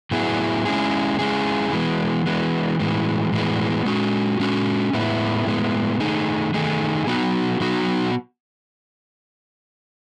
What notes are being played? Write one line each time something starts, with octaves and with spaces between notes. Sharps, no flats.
A2 F#3 B3 E4 G#4
G#3 C#4 E4 G#4
G#3 C#4 E4 G#4
E3 G#3 B3
E3 G#3 B3
A2 E3 G#3 B3
A2 E3 G#3 B3
G#3 C#4 F#4
G#3 C#4 F#4
A2 G#3 B3 E4
A2 G#3 B3 E4
D#3 A3 D#4 G#4
D#3 A3 D#4 G#4
F#3 B3 D#4 F#4
F#3 B3 D#4 F#4